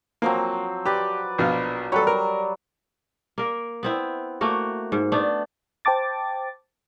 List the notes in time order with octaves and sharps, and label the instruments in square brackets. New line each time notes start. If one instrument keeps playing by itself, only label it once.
[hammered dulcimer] F3 F#3 C4 [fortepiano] A#3
[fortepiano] G4 [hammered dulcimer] B4 D5
[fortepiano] A#1 B2 F5
[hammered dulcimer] F#3 G3 [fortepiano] A4 B4 C#5
[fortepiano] A#4
[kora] A#3 A#4
B3 C4 E4
A3 A#3 F#4
G#2
A3 B3 D4
[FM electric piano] C5 G5 A5 D6 A6